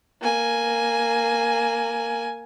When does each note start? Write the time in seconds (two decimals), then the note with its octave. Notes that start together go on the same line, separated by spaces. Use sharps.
0.22 A#3 G#5